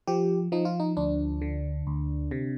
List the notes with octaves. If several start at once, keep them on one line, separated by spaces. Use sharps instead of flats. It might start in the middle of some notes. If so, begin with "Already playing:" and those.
F3 G4
F3 D#4
F4
D#4
D2 D4
D3
D2
C3